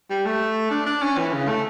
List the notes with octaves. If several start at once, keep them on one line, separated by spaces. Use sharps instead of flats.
G3
A3
D4
D4
C#4
E3
C#3
A3